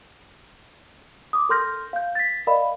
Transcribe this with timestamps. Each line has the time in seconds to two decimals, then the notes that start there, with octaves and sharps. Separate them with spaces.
1.33 D6 D#6
1.49 A4 A#4 C6 F6 G6 A#6
1.93 F5 G6
2.15 A6 B6
2.47 A#4 D5 D#5 F5 B5